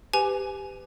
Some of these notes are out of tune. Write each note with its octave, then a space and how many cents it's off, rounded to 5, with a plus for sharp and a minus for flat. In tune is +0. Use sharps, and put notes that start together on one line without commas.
G4 +10 B4 +30 G#5 +15